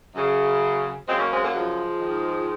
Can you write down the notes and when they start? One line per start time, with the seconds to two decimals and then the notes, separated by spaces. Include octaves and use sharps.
0.14 F#2 C#3
1.07 F#2 C#3 G#3 C4
1.19 A#3 C#4
1.31 G#3 C4
1.43 F#3 A#3
1.54 F3 G#3
2.01 G#2 D#3